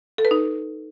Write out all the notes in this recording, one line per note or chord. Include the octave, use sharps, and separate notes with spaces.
A4
B4
D#4